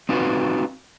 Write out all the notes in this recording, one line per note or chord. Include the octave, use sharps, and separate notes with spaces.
C4 D#4 F4 F#4 B4